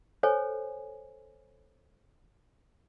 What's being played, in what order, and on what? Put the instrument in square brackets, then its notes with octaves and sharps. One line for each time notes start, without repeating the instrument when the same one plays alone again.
[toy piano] A4 C5 C#5 G#5